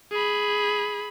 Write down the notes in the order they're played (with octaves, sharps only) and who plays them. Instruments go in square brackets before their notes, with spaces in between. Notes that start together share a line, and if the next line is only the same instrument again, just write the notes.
[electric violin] G#4 B5